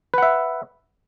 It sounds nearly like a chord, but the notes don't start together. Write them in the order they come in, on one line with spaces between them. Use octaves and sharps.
B4 F#5 E5